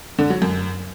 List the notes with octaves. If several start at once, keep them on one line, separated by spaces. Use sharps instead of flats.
D3
F#3
F#2